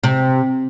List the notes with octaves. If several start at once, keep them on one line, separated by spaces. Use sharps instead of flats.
C3